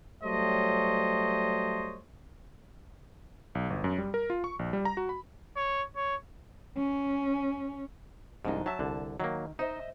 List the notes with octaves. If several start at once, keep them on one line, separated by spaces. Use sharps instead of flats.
F#3 G3 A3 C5 C#5 D#5
B1
G1
F#2
G3
A#4
F4
C#6
A#1
G3
A#5
F#4
B5
C#5
C#5
C#4
C2 G#2 F3 D4 D#4
F#3 E5 A5
C2 D3
D#3 F#3 A#3
D#4 C5 D#5 E5